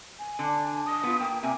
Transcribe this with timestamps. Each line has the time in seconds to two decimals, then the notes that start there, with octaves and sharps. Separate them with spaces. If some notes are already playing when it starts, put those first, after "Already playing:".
0.19 G#5
0.39 D3
0.86 D#6
1.03 B3 F4
1.20 A#3 G5
1.43 C3 A#3 E5 G#5